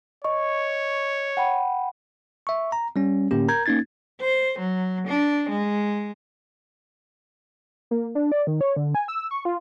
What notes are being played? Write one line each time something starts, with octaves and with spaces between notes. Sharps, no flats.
C#5 D#5 C#6
F#5 G5 B5
E5 C#6
A#5
G3 C#4
A2 D3 A#3 C#4 G4
A#4 A#5 G6 G#6
A#3 C#4 D#4 G#6 A6
C5
F#3
D4
G#3
A#3
D4
D5
D#3
C#5
D3
G#5
E6
C#6
F4